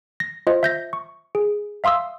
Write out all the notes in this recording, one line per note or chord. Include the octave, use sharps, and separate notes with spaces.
A#6
F4 C5 D#5
E5 G6 A#6
C#6
G#4
E5 F5 C6 D#6 E6